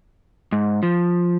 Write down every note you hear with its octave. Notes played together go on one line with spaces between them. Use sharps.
G#2
F3